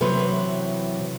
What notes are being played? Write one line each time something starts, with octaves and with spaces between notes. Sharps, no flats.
C3 E3 F#3 B4